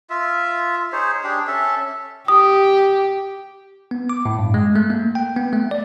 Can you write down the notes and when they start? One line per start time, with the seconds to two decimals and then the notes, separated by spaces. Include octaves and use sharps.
0.10 F4 E5
0.92 D#4 G#4 C5 C#5
1.24 D4 G4 G#4
1.47 C#4 A4 E5
2.28 G4 D#6
3.91 B3
4.09 D6
4.25 A2
4.39 G2
4.54 G#3
4.75 A3
4.90 A#3
5.15 G5
5.36 B3
5.53 A3
5.71 D5